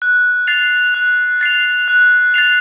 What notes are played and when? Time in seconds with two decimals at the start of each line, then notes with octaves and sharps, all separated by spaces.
0.02 F#6
0.47 A6 C7 F7
0.94 F#6
1.41 A6 C7 F7
1.88 F#6
2.34 A6 C7 F7